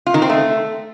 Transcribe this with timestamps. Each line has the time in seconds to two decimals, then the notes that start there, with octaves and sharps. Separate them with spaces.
0.07 F4
0.14 D#3
0.22 C4
0.30 A3